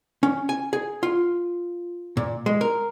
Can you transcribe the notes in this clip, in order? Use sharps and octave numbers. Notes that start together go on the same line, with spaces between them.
C#4
G#5
G#4
F4
A#2
G#3
A#4